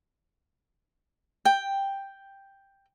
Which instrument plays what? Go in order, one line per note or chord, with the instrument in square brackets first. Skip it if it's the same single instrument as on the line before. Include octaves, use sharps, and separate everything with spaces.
[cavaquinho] G5